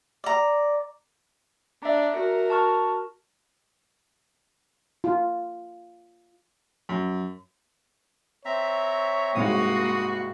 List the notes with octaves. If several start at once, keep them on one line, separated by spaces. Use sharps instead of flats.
D5 A#5
D4 E5 A#5
F#4 A#4
A5 C#6 F6
F4
F#2
C4 C#5 E5 A#5
C2 G#2 A#3 F#4 F5 D#6